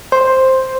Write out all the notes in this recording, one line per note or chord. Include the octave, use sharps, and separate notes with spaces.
C5